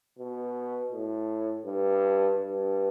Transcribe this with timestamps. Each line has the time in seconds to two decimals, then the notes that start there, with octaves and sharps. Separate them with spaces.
0.19 B2
0.92 A2
1.65 G2
2.39 G2